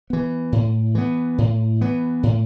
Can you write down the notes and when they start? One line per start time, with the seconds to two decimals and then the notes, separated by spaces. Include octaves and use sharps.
0.10 E3 B3
0.52 A2
0.95 E3 B3
1.38 A2
1.81 E3 B3
2.23 A2